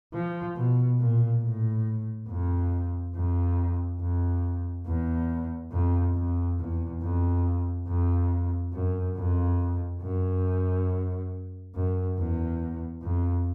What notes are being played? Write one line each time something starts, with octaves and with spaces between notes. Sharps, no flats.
F3
B2
A#2
A2
F2
F2
F2
E2
F2
F2
E2
F2
F2
F#2
F2
F#2
F#2
E2
F2